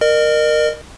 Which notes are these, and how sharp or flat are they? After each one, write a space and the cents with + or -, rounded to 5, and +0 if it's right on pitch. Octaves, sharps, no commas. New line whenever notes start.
A#4 +0 D#5 -40